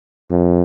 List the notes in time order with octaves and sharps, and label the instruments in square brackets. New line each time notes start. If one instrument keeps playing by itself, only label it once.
[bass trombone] F2